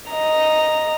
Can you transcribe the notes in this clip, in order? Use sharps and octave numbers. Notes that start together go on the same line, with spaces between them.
D#5 A#5